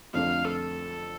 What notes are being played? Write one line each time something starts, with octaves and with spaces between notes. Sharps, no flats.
F2 D3 F3 A3 F5
A4